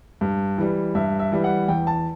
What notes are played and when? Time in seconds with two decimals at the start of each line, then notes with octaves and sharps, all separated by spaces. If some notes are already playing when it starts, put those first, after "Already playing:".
0.21 G2
0.58 E3 G3
0.95 G2 E5
1.19 E5
1.32 E3 G3
1.44 F#5
1.68 E2 G5
1.87 A5